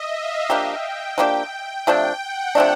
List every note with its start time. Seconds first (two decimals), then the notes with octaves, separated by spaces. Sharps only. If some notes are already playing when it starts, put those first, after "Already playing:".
Already playing: D#5 E5
0.16 F5
0.49 F3 A#3 D4 G4 G5
1.18 F3 A#3 D4 G4
1.87 C3 F3 A3 D4 G5
2.21 F#5
2.55 C3 F3 A3 D4